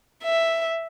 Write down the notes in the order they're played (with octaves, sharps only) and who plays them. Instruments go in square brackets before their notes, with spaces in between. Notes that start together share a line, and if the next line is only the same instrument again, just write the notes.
[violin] E5